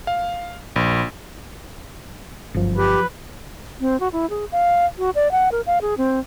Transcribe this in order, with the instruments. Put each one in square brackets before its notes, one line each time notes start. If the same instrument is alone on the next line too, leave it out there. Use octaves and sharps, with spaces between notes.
[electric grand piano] F5
A#1
[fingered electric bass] G1 [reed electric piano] F#2 F3
[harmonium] G4 [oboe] B4
[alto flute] C4
F#4
E4
G#4
F5
F#4
D5
F#5
A#4
F5
G#4
C4